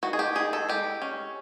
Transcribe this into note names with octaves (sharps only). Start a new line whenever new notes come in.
D#3 F#4
G#4
G4
D#3 G#4
A4
G#3 G4
C#4